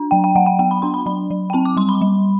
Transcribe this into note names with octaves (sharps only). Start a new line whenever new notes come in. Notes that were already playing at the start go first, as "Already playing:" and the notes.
Already playing: D4
F#3 G5
G5
F#3 F#5
G5
B3 G5
B5
D4 C6
B5
F#3 B5
F#3
G5
C4 A5
D6
G3 C6
B5
G3